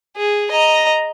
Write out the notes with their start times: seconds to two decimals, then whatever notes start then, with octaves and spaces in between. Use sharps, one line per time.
0.17 G#4
0.51 D#5 A#5